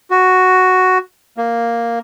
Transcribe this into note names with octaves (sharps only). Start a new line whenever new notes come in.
F#4
A#3